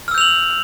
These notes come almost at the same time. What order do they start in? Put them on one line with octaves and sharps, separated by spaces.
F6 E6 G6 F7 F#7